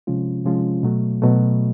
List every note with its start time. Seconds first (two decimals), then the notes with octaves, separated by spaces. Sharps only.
0.07 C3 F3 G#3 C#4 F4
0.45 C3 F3 G#3 C#4 F4
0.83 B2 F#3 A3
1.22 B2 F#3 A3